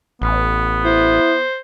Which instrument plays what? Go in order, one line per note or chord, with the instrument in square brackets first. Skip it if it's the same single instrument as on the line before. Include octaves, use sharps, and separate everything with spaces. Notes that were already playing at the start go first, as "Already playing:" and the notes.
[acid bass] A1 [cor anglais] B3
[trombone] E4 [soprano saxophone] C5